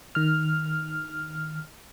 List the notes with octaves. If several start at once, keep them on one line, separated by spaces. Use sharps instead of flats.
D#3 F6